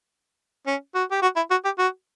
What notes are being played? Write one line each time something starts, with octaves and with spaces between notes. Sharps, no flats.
C#4
F#4
G4
F#4
E4
F#4
G4
F#4